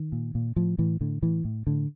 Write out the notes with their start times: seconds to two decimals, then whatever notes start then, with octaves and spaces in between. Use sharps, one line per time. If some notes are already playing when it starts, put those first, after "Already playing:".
Already playing: D#3
0.12 A#2
0.35 A#2
0.56 A2 F3
0.78 A2 E3
1.01 A2 D3
1.22 A2 E3
1.45 A2
1.67 A2 D3